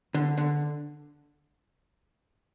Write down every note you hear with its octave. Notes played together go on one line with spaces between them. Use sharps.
D3
D3